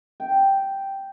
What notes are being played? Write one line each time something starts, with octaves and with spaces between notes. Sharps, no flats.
G5